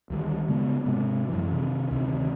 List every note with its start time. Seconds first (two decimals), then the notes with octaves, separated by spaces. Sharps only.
0.10 D2 D#3 G3
0.48 C#3 G#3 B3
0.86 G#2 C3 G#3
1.29 F#2 E3
1.52 C3 D#3
1.91 D2 C3 D#3